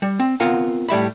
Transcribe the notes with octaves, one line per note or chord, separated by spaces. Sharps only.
G3
C4
B3 C4 F4 A#4 F#5 G#5
A2 G3 E5 B5